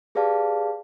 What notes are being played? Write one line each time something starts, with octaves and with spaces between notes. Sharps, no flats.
G4 G#4 B4 D5 F5 A5